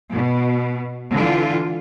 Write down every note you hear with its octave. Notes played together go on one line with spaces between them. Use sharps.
B2
D3 E3 F4